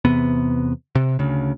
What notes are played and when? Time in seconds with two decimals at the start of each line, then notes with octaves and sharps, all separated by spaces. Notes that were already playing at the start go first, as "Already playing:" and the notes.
0.05 E2 C3 B3
0.95 C3
1.19 D2 C#3